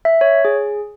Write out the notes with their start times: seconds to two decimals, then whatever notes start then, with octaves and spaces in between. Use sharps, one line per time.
0.05 E5
0.21 C#5
0.45 G#4